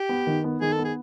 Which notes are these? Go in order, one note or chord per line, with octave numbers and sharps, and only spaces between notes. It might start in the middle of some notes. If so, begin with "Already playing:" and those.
Already playing: G4
B3
D#3
B3
D#3 G#4
A4
B3
G#4